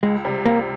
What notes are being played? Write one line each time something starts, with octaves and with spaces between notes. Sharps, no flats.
C#2 G#3
C3 G3
C#2 A#3